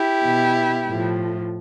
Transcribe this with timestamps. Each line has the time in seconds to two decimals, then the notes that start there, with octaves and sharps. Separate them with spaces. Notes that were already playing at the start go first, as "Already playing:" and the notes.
Already playing: E4 G4
0.23 B2
0.87 A2 F3